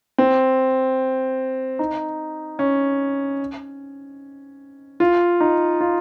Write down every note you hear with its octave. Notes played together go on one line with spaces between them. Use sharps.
C4
D#4
C#4
F4
D#4
F4